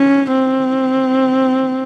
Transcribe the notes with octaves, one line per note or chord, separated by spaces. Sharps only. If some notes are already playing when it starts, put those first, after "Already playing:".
Already playing: C#4
C4